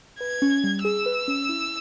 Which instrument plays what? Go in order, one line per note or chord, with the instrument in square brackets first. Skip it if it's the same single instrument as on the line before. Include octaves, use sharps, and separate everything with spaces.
[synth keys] B4 [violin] G#6
[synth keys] C#4
G3
[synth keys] G#4 [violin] E6
[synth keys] B4
C#4
E4